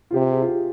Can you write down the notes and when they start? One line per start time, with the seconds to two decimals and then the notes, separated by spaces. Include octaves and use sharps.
0.11 F4
0.14 C3 G4
0.31 G#4
0.41 F4
0.49 G4